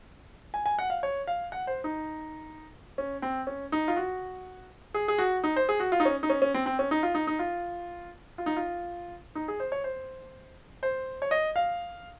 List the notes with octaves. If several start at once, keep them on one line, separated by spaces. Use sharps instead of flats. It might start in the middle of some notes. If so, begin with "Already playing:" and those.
G#5
G#5
F#5
F5
C#5
F5
F#5
C5
D#4
C#4
C4
C#4
D#4
F4
F#4
G#4
G#4
F#4
D#4
C5
G#4
F#4
F4
D#4
C#4
D#4
C#4
C#4
C4
C4
C#4
D#4
F4
D#4
D#4
F4
F4
D#4
F4
D#4
G#4
C5
C#5
C5
C5
C#5
D#5
F5